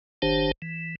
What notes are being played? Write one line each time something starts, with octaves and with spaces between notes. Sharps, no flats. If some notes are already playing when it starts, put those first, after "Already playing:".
F#1 D#3 D4 G4 C5 A5
E3